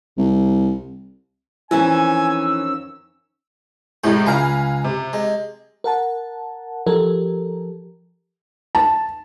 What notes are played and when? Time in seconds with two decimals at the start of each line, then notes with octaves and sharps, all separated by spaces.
0.17 C2
1.71 F2 D#3 E3 C#4 G#5 E6
4.04 A2 C3 G#3 G#4
4.26 C#2 F5 G#5 A#5 B5
4.84 C3
5.13 G#3
5.84 A#4 F#5 A5
6.87 F3 G4 A4 A#4
8.75 A5